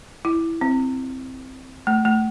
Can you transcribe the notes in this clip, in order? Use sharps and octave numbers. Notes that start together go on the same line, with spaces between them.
E4
C4
A3
A3